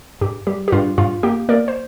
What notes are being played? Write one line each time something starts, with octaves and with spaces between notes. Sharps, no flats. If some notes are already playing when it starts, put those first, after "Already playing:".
G2 G4
G3 G4
G4
G2 F4
G2 F4
A#3 G4
A#3 A#4 D5
C5